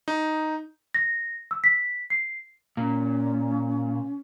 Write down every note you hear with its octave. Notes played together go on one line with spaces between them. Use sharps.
D#4
A#6
E6
B6
C7
A#2 C#4